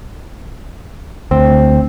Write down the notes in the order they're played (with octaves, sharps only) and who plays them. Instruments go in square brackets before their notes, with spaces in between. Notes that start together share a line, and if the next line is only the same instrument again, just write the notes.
[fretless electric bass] D2 [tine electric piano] C4